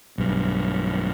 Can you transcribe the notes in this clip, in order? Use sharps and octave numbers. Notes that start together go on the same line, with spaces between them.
B1 G2